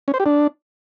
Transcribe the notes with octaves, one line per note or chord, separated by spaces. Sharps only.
C#4
C5
G4
D4